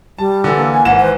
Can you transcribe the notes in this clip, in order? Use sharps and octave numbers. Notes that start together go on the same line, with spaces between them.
G3 A5
D3 E3 A4
A#3
G#5
G#1 E3 F#5 E7
B4 C5